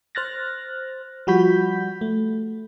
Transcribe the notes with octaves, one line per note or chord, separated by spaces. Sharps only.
C5 F6 F#6 A6 A#6
F3 G3 F#4 B5 G6 B6
A3